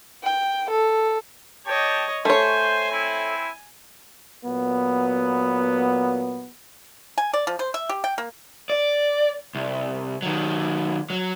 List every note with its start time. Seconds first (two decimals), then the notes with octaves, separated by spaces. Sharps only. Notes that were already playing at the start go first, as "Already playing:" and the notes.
0.23 G5
0.71 A4
1.66 G4 C#5 D#5 G5 A5
2.25 A3 C5 C#5 G#5
2.91 C4 E4
4.45 A#2 F#3 B3
7.18 G#5
7.34 D5
7.47 F3
7.59 C5
7.74 E5
7.90 G4
8.04 G5
8.18 A#3
8.70 D5
9.55 C2
10.22 D#3 F#3
11.10 F#3